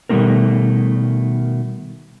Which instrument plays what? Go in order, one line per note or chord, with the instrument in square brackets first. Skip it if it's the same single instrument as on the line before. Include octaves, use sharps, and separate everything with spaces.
[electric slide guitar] B2 D#3 G3 A3 C4 A#4